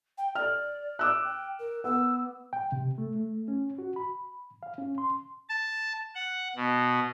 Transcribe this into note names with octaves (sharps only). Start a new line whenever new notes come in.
G5
D5 F6
D6 E6 F#6
G5
A#4
B3 E6
G5
C3
A3
A3
C#4
F#4
B5
F5
C#4
C6
A5
F#5
B2